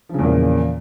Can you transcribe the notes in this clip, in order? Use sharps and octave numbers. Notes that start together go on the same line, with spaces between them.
E2 A#2 C#3 F3